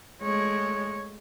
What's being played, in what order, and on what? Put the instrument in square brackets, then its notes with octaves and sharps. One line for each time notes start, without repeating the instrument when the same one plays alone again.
[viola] G#3 A3 [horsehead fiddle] C#5